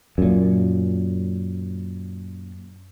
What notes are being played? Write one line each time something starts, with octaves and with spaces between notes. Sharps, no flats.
F#2 A#2